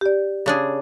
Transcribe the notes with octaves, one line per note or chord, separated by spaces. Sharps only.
G4 D5
C#3 D4 G#4